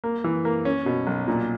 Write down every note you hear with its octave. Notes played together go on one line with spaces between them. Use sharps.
A#3
E3
A#3
C#4
B2
B1
A#2